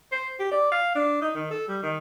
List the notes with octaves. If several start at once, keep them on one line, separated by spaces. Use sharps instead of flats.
C5
G4
D5
F5
D4
D#4
D#3
A4
G3
D#3